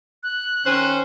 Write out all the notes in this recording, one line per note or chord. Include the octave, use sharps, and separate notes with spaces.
F#6
D#3 C#4 C5